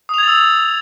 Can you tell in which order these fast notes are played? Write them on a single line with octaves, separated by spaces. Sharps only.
D#6 F7 G#6 A6 E6